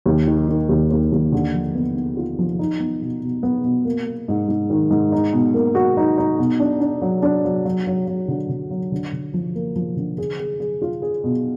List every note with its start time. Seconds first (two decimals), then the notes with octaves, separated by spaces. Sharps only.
0.06 D#2
0.27 D#3
0.48 D#3
0.69 D#2
0.91 D#2
1.12 D#2
1.32 D3
1.54 F3
1.75 B3
1.96 B3
2.17 F4
2.39 F3
2.59 D#4
2.80 B3
3.02 B2
3.23 B2
3.43 B3
3.64 B2
3.85 A#3
4.06 A#3
4.28 G#2
4.48 G#2
4.70 D#3
4.91 G#2
5.12 D#4
5.33 B2
5.54 A#3
5.75 F#4
5.97 D#4
6.18 D#4
6.39 B2
6.60 D4
6.80 D4
7.02 F#3
7.22 D4
7.45 F#3
7.65 F#3
7.87 F#3
8.07 F#3
8.28 D3
8.49 D3
8.70 F#3
8.92 D3
9.13 D3
9.34 F3
9.55 A#3
9.76 F3
9.97 D3
10.18 G#4
10.39 G#4
10.60 G#4
10.82 F4
11.02 G#4
11.24 B2